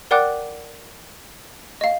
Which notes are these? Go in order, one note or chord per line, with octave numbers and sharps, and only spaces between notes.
A#4 D5 F#5 G5 D6 F#6
D#5 F5